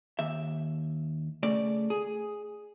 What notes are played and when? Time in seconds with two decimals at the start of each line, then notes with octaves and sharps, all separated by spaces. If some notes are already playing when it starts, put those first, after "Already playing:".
0.19 D#2 E5
1.43 C#3 A3 D5
1.90 G#4